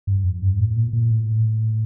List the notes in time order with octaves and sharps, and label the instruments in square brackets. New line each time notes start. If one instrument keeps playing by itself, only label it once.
[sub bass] G2
F2
G2
A2
A#2
A#2
A2